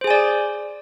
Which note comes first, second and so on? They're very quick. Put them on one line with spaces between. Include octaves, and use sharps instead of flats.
C5 G#4 G#5 D5